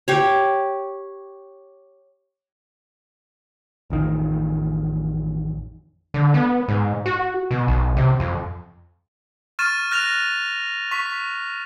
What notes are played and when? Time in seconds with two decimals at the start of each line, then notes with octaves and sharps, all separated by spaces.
0.08 G4 C#5
3.90 A1 F2 D#3
6.14 D3
6.34 B3
6.68 G#2
7.06 F#4
7.51 B2
7.68 B1
7.97 C3
8.20 F2
9.59 C#6 F6 A6 D#7 E7
9.91 F6 F#6 A#6 D#7 F7
10.91 C#6 B6